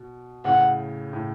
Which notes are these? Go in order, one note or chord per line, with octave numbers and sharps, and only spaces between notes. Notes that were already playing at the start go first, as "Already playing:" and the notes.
Already playing: B2
A2 C#3 F#5
A2